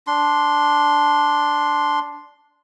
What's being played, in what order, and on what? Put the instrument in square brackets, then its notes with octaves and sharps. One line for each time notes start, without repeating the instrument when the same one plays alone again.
[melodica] D4 C6